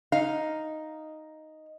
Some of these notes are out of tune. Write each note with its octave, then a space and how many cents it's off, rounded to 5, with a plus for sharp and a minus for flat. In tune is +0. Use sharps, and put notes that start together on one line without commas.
D#4 +0 F5 +0